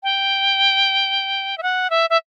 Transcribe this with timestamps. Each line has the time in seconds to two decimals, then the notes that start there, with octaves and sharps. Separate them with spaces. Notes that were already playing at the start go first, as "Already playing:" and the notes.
0.03 G5
1.58 E5
1.63 F#5
1.90 E5
2.10 E5